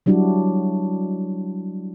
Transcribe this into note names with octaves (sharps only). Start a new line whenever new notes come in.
F#3 G3 D4 E4 F#4